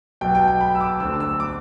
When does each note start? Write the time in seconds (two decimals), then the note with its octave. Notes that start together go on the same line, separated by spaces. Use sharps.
0.21 B1 B2 G5
0.35 G5
0.48 G5
0.61 B5
0.75 E6
0.81 D6
1.00 D2 D3 E6
1.20 E6
1.40 D6